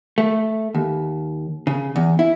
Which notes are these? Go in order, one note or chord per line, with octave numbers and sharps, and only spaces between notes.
A3
D#2
C#3
E2
E4